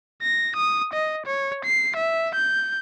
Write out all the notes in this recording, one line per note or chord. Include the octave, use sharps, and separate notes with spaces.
A#6
D#6
D#5
C#5
C7
E5
G6